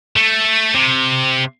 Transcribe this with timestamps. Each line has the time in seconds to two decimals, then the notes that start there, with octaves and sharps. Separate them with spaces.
0.16 A3
0.74 C3